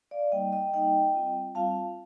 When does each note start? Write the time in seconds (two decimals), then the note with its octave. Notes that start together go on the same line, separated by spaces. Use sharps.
0.11 D5 F5
0.32 G3 A#3 D#4 D#5 G5
0.52 D#5 G5
0.73 G3 A#3 D#4 D#5 G5
1.14 G3 C4 F4
1.55 G3 C4 F4 F5 A5